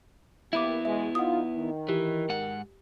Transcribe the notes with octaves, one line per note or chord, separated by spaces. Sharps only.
A#3 B3 E4 G4 E5 B5 D6
B2 G#3 E5
D#4 F4 F#5 D#6
D#3
E3 G4
G#2 F#5